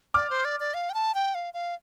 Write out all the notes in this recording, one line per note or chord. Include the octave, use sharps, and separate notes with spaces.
D5 D6 F6
C5
D5
D5
F5
G5
A5
G5
F5
F5